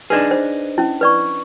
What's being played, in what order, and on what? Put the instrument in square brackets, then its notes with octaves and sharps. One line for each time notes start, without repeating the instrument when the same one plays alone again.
[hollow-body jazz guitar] D4 D#4 G#4 [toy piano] B4 D5
[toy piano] C5
C#4 E4
B4 D5 C#6